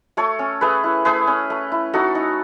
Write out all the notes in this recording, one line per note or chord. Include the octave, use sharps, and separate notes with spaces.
A3 A4 C#5
C#4
A3 G#4 B4
E4
A3 G#4 B4
C#4
A3
E4
D#4 F#4 A4
D#4